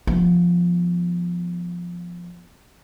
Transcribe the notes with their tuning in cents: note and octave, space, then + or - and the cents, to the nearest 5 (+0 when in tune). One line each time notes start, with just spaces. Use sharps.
F3 +0 B3 +0